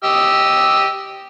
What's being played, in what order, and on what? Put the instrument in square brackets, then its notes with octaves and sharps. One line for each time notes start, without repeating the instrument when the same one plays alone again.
[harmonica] G4 D#5 E6